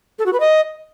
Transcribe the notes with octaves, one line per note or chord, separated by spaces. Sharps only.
A4
F#4
B4
D#5